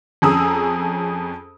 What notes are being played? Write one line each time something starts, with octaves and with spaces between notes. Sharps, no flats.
F2 C#4 G#4 A#5 D#6 E6